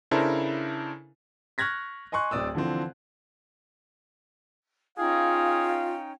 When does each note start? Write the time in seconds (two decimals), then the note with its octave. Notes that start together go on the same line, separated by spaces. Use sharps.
0.11 C#3 D4 E4 A4 A#4 C5
1.58 C#6 F6 F#6 G#6 A#6 B6
2.12 D#5 G#5 C6 C#6 F#6
2.31 D1 C4 D5 D#6 E6
2.55 D3 E3 F3 C4
4.98 C#4 D#4 F4 G#4 F5 G5